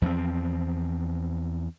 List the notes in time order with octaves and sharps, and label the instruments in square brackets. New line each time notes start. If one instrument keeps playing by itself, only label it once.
[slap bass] E2 F3 A#3 C4